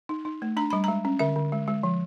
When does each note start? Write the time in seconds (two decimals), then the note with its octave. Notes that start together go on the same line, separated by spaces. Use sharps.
0.09 D#4
0.25 D#4
0.42 A3
0.57 D4 A#5
0.70 G3 B5
0.84 G#3 A#5
1.05 C#4
1.19 D3 E5
1.36 D3
1.52 G#3
1.68 G#3
1.83 F3